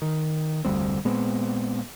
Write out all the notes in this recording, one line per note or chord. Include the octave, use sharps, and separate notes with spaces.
D#3
F1 D2 G3 C4
A#2 G#3 B3 C4